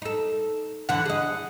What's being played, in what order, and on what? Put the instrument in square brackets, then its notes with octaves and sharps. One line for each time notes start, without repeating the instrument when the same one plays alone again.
[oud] D#4 A4
[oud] E2 D3 E3 [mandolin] F#5
[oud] G#4 D#5